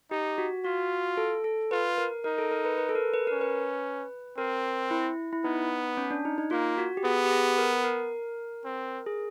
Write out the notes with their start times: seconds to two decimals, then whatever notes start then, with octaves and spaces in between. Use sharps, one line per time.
0.11 D#4 G4
0.38 F#4
0.65 F4 F#4
1.17 A4
1.44 A4
1.71 F4 B4
1.98 A#4
2.24 D#4 A#4
2.38 A4
2.52 A#4
2.65 B4
2.78 B4
2.89 A4
2.95 A#4
3.14 B4
3.27 C#4 A#4
3.41 B4
4.37 C4 A#4
4.91 E4
5.33 E4
5.44 B3 D#4
5.97 C#4
6.11 D4
6.25 D#4
6.38 D#4
6.51 A#3 F4
6.78 F#4
6.97 G4
7.04 B3 G#4
7.24 G4
7.31 G#4
7.58 A#4
7.84 A#4
8.65 C4
9.06 G#4